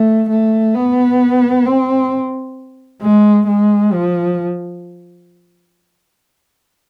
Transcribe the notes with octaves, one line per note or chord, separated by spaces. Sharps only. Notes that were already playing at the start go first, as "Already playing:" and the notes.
Already playing: A3
A3
B3
C4
G#3
G#3
F3